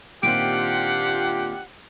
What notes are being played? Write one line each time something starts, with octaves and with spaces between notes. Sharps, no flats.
A#2 D#3 C4 D4 F4 G4 F#5 D7